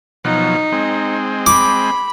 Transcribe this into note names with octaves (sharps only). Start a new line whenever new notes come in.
B2 F3 F#3 D#4
G#3 C4
B5 D6